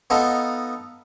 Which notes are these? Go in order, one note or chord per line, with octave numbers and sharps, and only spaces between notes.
B3 D#4 F4 A4